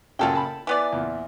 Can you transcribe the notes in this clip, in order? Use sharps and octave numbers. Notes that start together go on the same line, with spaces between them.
F#2 A#2 C#3 F4 A4 G5
A5 B5
E3 B3 D5
E2 A#2